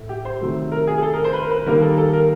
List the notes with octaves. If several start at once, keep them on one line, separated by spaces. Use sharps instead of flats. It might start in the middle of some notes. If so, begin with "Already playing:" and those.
Already playing: A2 A3
G4
C5
C3 D#3 F#3 A3
A#4
G#4
G#4
A4
A#4
C5
B4
A#4
B4
D#3 G3 A#3 A#4
A4
A4
A#4